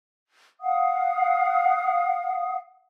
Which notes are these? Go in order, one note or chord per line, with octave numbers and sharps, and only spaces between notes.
F5 F#5 D#6